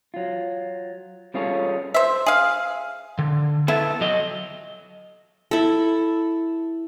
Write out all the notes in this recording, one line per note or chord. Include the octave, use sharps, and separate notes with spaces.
F#3 F4
G3 C#4 F4 G#4 A4 C#5
C5 E5
G#4 F5
D3
B3 E4 A4
F#3 D#5
E4 A4